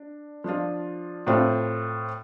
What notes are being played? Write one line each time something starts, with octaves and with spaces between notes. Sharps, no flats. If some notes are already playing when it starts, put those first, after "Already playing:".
Already playing: D4
F3 D4 F4
A2 A3 C4 F4